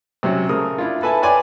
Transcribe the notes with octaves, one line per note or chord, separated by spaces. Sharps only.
C3 F#3 C4 C#4
C#3 A3 A#4 D#6
D4 E4 F4
A4 B4 E5 G#5 A5
B4 C#5 D5 G5 G#5 C6